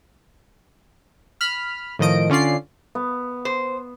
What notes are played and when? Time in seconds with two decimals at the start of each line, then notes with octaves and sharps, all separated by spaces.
1.41 B5 F6
1.99 A2 D#3 F3 D#5 D7
2.30 D3 C#4 F4 D5 C7
2.95 B3
3.45 C5